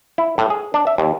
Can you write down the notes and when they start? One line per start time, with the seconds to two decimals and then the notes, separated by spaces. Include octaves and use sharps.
0.18 E4
0.38 A2
0.50 G#4
0.74 D4
0.87 E5
0.98 D#2